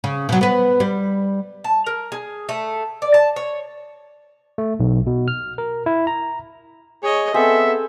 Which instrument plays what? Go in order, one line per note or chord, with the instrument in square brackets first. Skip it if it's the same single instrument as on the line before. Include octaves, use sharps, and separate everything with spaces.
[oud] C#3
B2 F#3
B3 B4
G3
[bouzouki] A5
A#4
G#4
A3
D5
A5
C#5
[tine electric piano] A3
B1
B2
F6
A#4
E4
A#5
[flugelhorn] G#4 [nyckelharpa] C#5 D#5
[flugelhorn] B3 [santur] C4 G#4 E6 [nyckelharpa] A4 [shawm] E5